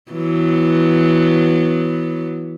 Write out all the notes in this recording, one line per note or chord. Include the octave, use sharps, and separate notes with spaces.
E3 F#3 B3